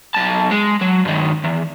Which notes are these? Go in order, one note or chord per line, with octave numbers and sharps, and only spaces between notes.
B1 A5
G#3
F#3
G2 D#3
E2